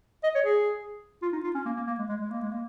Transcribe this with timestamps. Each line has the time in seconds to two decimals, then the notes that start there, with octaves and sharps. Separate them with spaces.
0.24 D#5
0.35 C#5
0.45 G#4
1.22 F4
1.33 D#4
1.44 F4
1.55 C#4
1.66 A#3
1.76 A#3
1.87 A#3
1.99 G#3
2.09 G#3
2.20 G#3
2.30 A#3
2.41 G#3
2.51 A#3